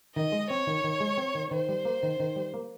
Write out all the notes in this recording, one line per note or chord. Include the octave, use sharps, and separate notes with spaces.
D#3 D#5
G#3
C4 C#5
D#3
D#3
G#3
C4
D#3
D#3 C5
G3
A#3
D#3
D#3
G3
A#3